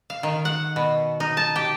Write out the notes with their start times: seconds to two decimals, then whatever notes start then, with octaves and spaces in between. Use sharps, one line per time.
0.10 F5
0.23 D#3
0.45 F#5
0.76 B2
1.20 D#4
1.37 A5
1.56 G4